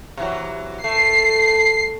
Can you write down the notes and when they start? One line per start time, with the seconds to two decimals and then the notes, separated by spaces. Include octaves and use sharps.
0.17 C3 E3 F#3
0.84 A3 C7